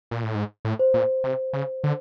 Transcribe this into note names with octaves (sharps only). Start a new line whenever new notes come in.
A#2
A2
G#2
A2
C5
A#2
C3
C#3
D3